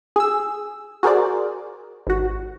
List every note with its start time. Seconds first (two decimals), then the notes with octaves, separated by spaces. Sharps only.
0.16 G#4 E6
1.03 F#4 G#4 A#4 C5 D5
2.07 G#1 F#4